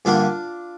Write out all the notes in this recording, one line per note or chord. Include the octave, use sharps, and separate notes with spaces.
G2 D3 G3 A#3 D4 F4